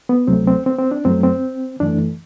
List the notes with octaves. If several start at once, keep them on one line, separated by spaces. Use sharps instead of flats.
B3
D2 C3 F#3 A3 C4
C4
C4
C4
D4
F#2 F#3 A3 C4
C4
F#2 E3 A3 D4